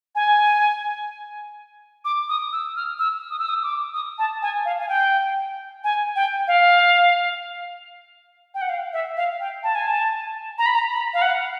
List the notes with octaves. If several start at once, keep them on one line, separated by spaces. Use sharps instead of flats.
G#5
D6
D#6
E6
F6
E6
D#6
E6
D#6
D6
D#6
A5
G#5
F5
G#5
G5
G#5
G5
F5
G5
F#5
F5
E5
F5
G5
A5
G#5
A5
A#5
B5
A#5
B5
F5
F#5